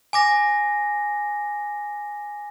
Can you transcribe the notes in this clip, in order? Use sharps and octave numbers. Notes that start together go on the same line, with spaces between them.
G#5 D6 A#6